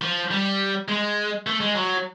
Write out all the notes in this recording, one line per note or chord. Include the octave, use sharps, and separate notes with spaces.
F3
G3
G#3
A3
G#3
F#3